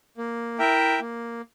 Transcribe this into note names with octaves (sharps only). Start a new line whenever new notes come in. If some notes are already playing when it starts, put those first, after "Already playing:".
A#3
E4 A#4 E5 G5
A#3